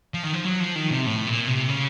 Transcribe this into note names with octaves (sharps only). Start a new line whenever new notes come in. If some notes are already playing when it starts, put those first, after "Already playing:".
F3
D#3
F3
F#3
F3
D#3
C3
A2
A#2
C3
C#3